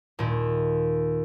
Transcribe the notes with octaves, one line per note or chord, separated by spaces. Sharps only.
D#2 A#2